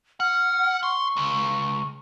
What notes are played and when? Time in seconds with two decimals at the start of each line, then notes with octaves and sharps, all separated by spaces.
0.20 F#5 F6
0.83 C6 C#6
1.17 C#2